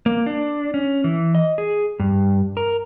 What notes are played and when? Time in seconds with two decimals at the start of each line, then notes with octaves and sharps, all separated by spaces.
0.06 A#3
0.26 D4
0.74 C#4
1.04 E3
1.35 D#5
1.58 G#4
2.00 G2
2.57 A#4